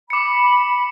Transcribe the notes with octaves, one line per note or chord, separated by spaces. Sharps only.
B5 D6 C#7